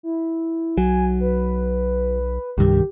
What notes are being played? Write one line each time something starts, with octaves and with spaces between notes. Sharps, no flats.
E4
B1 F#3 G#5
B4
C2 G2 D#3 G4